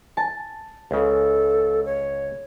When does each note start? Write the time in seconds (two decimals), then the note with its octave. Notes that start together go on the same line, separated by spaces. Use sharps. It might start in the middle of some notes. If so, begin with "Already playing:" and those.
0.17 A5
0.91 C#2 C#3 A4
1.85 C#5